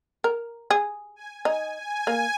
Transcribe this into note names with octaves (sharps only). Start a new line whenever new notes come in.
A#4
G#4
G#5
D#4 G#5
G#5
A#3